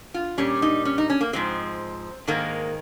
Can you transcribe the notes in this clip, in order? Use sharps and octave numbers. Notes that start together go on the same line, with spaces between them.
F4
A#2 G3 C#4
D#4
C#4
D#4
C#4
A#3
G#2 F3 G#3 C4
G#2 D#3 G#3 A#3